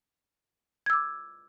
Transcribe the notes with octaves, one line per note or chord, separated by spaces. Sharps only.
D6 E6 G#6